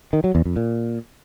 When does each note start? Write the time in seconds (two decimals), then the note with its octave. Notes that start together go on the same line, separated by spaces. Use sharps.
0.13 D#3
0.24 F#3
0.35 E2
0.45 F2
0.56 A#2